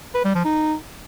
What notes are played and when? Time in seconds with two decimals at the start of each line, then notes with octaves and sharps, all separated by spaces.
0.14 B4
0.25 G3
0.35 F3
0.45 D#4